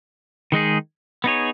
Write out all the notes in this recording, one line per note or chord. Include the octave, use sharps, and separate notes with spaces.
D#3 G#3 D#4 G#4
B3 D#4 G#4 C#5